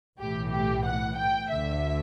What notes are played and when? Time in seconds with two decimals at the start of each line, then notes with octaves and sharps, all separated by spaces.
0.19 B1 A2 E3 G4
0.52 G4
0.86 F#5
1.18 G5
1.50 D2 D3 E5